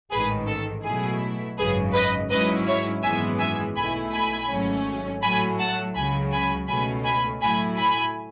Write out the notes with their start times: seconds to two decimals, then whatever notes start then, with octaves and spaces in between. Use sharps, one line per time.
0.11 A1 G#2 D#3 G#4 B4
0.47 A4
0.84 B2 F#3 A3 E4 G#4
1.58 G#1 F#2 C#3 F#3 G#4 B4
1.93 B4 D#5
2.30 G#2 F#3 C#4 E4 B4 D#5
2.67 C#5 E5
3.03 G#1 F#2 E3 G#3 B3 E5 G#5
3.39 E5 G#5
3.76 B1 B2 A3 E4 G#5 B5
4.12 G#5 B5
4.49 G#1 G#2 F#3 A3 C#4
5.22 A2 F#3 A3 G#5 B5
5.59 F#5 A5
5.95 C#2 C#3 F#3 G#5 B5
6.32 G#5 B5
6.68 C#2 B2 A3 C#4 G#5 B5
7.04 G#5 B5
7.42 A2 F#3 A3 E4 G#5 B5
7.78 G#5 B5